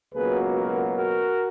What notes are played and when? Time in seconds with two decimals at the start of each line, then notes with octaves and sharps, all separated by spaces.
0.14 C#2 B2 F#3 A#3 G#4 B4
0.55 F#4 A#4
0.97 F#4 A#4